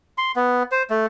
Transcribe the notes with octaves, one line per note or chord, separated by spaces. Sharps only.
C6
B3
C5
A3